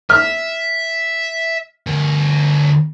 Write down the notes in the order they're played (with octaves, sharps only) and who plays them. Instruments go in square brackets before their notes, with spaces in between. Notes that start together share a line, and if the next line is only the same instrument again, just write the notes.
[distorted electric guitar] E5 [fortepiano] F6
[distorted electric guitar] D2 A#4